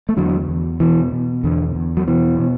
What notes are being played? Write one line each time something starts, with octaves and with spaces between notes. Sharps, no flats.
A3
E2 D3 F#3
E2
B2 E3
B2
E2 D3
E2
F#3
B2 E3
B2